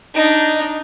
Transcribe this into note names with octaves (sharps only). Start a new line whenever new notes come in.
D4 D#4